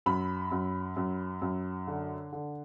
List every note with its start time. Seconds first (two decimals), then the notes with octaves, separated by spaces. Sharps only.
0.06 F#2 B5
0.52 F#2
0.97 F#2
1.42 F#2
1.87 D3
2.33 D3